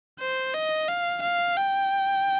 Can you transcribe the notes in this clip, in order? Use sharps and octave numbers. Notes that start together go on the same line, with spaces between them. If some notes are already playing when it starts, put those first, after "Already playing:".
C5
D#5
F5
F5
G5